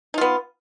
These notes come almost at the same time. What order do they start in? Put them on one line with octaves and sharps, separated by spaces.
D#4 F4 B3